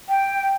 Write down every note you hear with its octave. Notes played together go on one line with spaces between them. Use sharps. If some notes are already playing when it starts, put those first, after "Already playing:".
G5